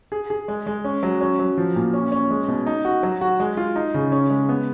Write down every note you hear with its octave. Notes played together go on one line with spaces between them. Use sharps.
G#4
G#4
G#3
G#3
C#4
F#3
C#4
F#3
F3
A#2
C#4
C#4
G#3
B2
D#4
F#4
F#3
F#4
G#3
F4
D#4
C#3
C#4
G#3
B3